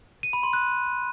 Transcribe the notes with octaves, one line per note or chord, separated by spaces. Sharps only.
D#7
B5
C6
F#6